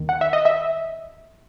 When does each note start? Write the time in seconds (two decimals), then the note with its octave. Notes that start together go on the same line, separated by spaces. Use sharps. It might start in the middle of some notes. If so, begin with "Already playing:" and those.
Already playing: D#2 D#3
0.09 F#5
0.21 E5
0.33 D#5
0.45 E5